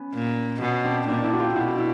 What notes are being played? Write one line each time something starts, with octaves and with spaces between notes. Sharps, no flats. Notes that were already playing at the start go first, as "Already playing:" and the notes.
Already playing: B3 C#4
A#2
B2 B3 C#4
C4 D4
A#2 C4 D4
D4 E4
F#4
F4 G4
B2 E4 F#4
E4